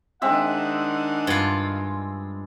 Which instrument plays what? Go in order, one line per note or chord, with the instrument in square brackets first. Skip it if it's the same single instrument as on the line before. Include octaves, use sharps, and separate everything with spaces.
[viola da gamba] D#3 D4 [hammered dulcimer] G#3 C4 E5 [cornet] F#5
[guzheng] G2 F4